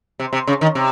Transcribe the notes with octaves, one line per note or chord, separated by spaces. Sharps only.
C3
C3
C#3
D#3
C3